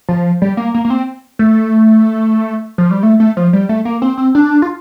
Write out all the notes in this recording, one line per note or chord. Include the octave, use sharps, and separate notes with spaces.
F3
G3
A#3
A#3
A#3
C4
A3
F3
G3
A3
A3
F3
G3
A3
A#3
C4
C4
D4
F4